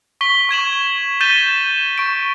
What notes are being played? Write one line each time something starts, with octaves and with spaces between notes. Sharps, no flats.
C#6 B6 G7
C#6 G#6 E7 F#7
G6 A6 B6 D#7 E7 G7
C#6 D7